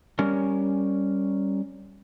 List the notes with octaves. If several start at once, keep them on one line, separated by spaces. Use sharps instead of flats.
G3 C#4 G4 A#4